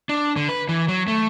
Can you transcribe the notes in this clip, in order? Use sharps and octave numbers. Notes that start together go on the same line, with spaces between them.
D4
D3
B4
E3
F#3
A3